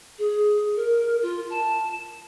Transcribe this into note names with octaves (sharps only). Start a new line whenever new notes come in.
G#4
A#4
F4
A5